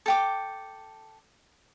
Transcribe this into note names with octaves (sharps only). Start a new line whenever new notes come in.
A4 G5 D6